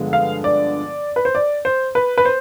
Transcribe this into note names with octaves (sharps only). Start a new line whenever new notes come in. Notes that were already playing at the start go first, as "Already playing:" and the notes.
Already playing: G2 D3 F3 G#3 B3
F5
D5
B4
C5
D5
C5
B4
B4
C5